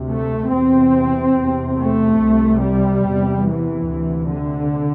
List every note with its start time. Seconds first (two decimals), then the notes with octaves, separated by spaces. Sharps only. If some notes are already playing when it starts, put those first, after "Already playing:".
Already playing: D2 C3
0.10 A3
0.51 E2 C3 C4
1.36 E2 C3
1.78 A3
2.21 C2 C3
2.62 G3
3.05 E2 C3
3.47 E3
3.89 D2 C3
4.31 D3